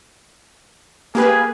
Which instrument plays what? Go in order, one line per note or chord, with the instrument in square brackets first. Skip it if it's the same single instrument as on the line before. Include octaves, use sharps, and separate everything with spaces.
[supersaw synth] A#3 G4 B4 [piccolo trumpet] G#4